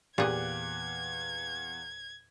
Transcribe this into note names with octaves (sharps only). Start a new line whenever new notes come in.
E2 A#2 G4 G#4 F5 F#6 G#6